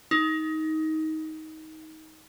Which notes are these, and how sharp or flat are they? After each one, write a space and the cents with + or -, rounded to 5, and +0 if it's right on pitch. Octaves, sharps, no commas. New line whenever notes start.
D#4 +20